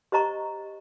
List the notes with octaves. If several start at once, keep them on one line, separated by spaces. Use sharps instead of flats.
G4 C5 D#5 A#5 C#6